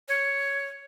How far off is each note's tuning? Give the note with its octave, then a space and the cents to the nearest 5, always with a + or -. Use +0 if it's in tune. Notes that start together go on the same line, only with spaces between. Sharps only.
C#5 +5